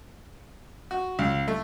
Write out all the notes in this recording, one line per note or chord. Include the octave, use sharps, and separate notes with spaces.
F#4
C#2
A3